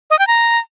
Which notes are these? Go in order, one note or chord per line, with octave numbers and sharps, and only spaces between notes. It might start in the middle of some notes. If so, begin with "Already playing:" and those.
D#5
G5
A#5